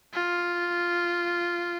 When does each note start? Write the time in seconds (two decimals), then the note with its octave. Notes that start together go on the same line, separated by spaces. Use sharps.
0.13 F4